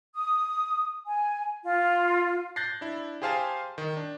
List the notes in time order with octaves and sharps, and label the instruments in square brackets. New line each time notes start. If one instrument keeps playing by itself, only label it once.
[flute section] D#6
G#5
F4
[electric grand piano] F#6 G6 A6 A#6 C7
D4 E4
G4 G#4 C5 F5 G#5 A5
D#3
D4